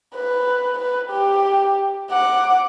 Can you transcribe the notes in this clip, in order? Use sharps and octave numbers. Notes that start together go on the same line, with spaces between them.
B4
B4
G4
F#5 D6